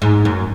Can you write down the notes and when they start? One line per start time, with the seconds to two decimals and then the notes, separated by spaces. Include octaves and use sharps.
0.02 G#2
0.25 F#2